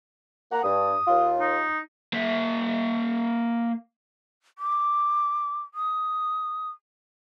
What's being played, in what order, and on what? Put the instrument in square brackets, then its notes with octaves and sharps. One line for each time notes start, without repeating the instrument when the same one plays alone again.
[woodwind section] A#3 F#5 A#5
[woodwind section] G2 [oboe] D#6
[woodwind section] D#2 F4
[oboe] D#4
[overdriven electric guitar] A#3 E5
[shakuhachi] D6
D#6